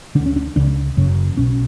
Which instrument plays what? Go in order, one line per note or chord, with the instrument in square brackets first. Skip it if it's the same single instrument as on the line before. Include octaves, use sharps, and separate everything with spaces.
[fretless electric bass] D2 D3 D4
C#4
D4
C#2 C#3 D4
F#1 F#2 C#3
B1 B2 C#4